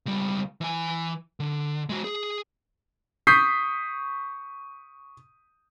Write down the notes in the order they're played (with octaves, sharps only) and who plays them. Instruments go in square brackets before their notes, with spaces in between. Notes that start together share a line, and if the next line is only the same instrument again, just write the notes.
[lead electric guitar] C#2 G3
E3 G#5
D3
G#3 F#4
G#4
[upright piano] C#6 D#6 G6 B6 C7